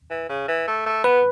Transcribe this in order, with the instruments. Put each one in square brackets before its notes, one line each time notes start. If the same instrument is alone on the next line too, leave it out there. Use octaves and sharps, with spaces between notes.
[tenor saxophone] E3
C#3
E3
A3
A3
[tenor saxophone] B3 [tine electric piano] B4